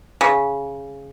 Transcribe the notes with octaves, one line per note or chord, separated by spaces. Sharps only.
C#3